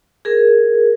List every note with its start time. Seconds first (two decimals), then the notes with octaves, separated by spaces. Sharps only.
0.25 G#4 A#4